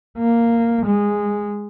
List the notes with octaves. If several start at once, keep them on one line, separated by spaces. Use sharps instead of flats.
A#3
G#3